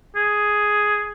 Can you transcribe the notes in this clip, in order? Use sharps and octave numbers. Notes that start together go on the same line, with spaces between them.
G#4